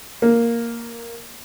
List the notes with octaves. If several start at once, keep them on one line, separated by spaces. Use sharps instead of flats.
A#3